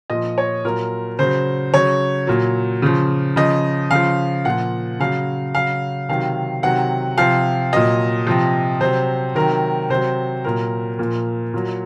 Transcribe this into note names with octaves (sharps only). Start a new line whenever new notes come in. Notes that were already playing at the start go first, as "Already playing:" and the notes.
A#2 F3 D#5
C#5
A#2 F#3 A#4
C#3 F#3 C5
C#3 F#3 C#5
A#2 F#3
C#3 F3
C#3 F3 D#5
C#3 F3 F5
A#2 F3 F#5
C#3 F#3 F5
C#3 F#3 F5
C3 D#3 F#3 F5
C3 D#3 F#3 F#5
C3 F3 F5
A#2 F#3 D#5
C3 F3
C3 F#3 C5
C3 D#3 F#3 A#4
C3 F#3 C5
A#2 F#3 A#4
A#2 F3
A#2 F#3